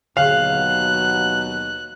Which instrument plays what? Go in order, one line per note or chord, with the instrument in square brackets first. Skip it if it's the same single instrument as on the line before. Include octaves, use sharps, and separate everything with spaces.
[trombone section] D#2 B2 F#3 [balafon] D3 G#4 [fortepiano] F5 [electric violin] F#6